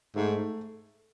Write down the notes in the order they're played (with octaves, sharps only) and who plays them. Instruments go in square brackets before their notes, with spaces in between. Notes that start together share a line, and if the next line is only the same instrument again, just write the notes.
[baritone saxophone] G#2 [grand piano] A3